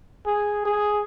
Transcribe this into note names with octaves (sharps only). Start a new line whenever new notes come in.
G#4
G#4